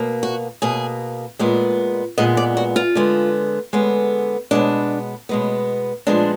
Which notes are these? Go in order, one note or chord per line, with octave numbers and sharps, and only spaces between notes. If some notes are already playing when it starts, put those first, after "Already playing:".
Already playing: B2 A#3
F#4
B2 A#3 G#4
A#2 G#3 B3
A#2 G#3 B3 D#5
D5
F#4
F4
D3 G#3 B3
D3 G#3 B3
B2 G#3 B3 D4
B2 G#3 B3
A#2 F3 G#3 B3 D4